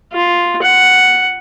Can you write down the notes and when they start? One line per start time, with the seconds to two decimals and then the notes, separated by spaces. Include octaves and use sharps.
0.13 F4
0.62 F#5